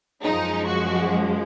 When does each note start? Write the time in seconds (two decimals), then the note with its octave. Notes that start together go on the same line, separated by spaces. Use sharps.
0.22 F#2 F3 G#3 D#4
0.67 F#4